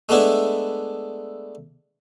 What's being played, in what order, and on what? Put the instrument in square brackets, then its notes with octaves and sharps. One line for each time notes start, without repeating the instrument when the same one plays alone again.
[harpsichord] G#3 A3 B3 D4 E4